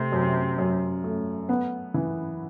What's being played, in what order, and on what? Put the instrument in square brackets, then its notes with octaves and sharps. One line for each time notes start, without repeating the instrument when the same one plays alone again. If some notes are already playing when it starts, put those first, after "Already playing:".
Already playing: [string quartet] C3 [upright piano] A3
[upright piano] F#2
F#2
A3
B3
E3